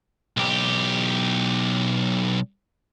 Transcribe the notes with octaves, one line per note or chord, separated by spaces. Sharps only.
B1 G4